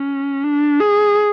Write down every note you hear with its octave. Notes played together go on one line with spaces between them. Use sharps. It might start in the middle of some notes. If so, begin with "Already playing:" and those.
Already playing: C#4
D4
G#4